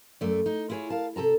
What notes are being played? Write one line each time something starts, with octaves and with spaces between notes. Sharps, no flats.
F#2 A3 D5
D#4
E4 F4 G#4 B4 C#5
A#4 F5 A5
C3 A4 A5 A#5